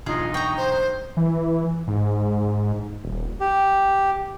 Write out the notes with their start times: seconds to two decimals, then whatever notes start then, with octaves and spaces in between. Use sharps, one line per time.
0.06 B1 E2 G2 D#4 F4 G#4
0.34 G5 A#5 C#6
0.57 C5
1.17 E3
1.87 G#2
3.04 D#1
3.40 G4